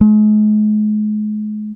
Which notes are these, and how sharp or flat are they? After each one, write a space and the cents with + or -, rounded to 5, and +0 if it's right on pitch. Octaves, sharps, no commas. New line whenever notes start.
G#3 +40